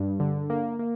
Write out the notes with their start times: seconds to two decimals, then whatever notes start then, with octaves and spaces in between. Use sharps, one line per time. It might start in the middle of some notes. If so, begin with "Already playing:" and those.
Already playing: G2
0.20 D3
0.50 A#3
0.79 A#3